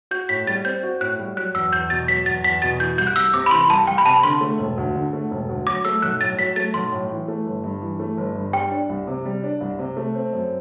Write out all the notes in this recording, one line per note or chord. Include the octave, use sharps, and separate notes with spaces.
F#4 G6
A2 B6
G3 A6
C4 G6
F#4
A2 F#6
G3
F#3 F#6
E2 E6
E2 G6
B2 A6
F#3 B6
E2 A6
E2 B6
B2 A6
E3 G6
C2 G6
F#6
C2 E6
C3 D6
B5
E3 C6
C2 A5
C2 G5
B5
C3 A5
D3 C6
A3
E1
D2
D3
A3
E1
D2
F#3 D6
A3 E6
B1 F#6
A2 A6
F#3 B6
A3 A6
B1 C6
A2
E3
A3
G1
G2
E3
A3
G1
G2
G3 G5
D4
C2
C3
G3
D4
C2
C3
A3
C4
F#2